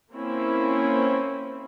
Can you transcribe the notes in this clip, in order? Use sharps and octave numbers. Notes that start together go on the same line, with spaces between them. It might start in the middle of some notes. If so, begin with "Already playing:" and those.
A#3 C4 C#4 E4